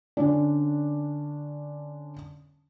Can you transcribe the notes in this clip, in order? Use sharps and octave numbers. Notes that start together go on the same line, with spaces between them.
D3 C#4 D4